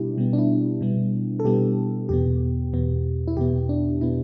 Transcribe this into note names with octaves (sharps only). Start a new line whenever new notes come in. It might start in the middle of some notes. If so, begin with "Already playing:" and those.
Already playing: B2 G3 B3 D4 E4 G4
B2 G3 B3
D4
E4
B2 G3 B3
A4
B2 G3 B3 G4
E2 B2 B3 G4
E2 B2 B3
E4
E2 B2 B3 G4
D4
B2 B3 E4